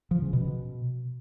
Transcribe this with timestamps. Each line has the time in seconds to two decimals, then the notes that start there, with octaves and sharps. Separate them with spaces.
0.11 F3
0.22 C#3
0.33 B2